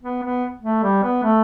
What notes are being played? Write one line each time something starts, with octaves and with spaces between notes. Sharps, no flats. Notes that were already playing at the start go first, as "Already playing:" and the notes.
B3
B3
A3
G3
B3
A3